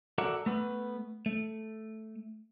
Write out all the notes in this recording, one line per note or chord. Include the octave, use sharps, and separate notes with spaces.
F#4 A4 A#4 D5 E5 F#5
A3 B3 B4
A3